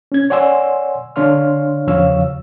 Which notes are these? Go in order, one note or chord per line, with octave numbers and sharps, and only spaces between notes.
C#4 G#6
C#5 D5 F#5 G#5 C6 E6
D3 D4 C#5 F5 C6 F6
E2 C#3 F3 C#5 F5 E6